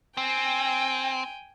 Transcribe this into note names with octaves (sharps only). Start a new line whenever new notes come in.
C4 G5 G#5